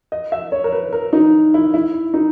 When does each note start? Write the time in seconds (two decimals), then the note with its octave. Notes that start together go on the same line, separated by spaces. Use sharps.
0.12 D#5
0.32 E5
0.52 C#5
0.64 A#4
0.73 B4
0.93 A#4
1.13 D#4
1.54 E4
1.74 E4
2.14 D#4